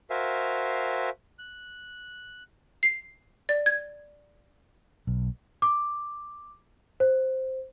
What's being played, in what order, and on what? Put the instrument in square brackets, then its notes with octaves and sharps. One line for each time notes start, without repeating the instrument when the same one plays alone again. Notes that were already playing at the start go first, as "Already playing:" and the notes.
[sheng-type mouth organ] F#4 A#4 C5 E5 F5 G#5
F#6
[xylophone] C7
D5
G#6
[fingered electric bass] B1
[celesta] D6
C5